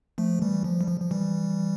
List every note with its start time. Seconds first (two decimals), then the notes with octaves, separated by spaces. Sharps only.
0.18 F3 A3
0.42 E3 G3
0.64 F3
0.81 G3
0.88 F3
1.00 F3
1.11 E3 G3